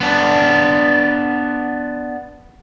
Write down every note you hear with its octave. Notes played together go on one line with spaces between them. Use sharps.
B3 D4